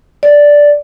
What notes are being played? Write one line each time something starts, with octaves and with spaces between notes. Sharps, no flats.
D5